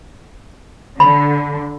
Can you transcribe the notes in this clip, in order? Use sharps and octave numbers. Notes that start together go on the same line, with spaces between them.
D3 B5